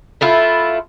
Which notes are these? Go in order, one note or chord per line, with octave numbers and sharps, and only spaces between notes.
A3 E4 F4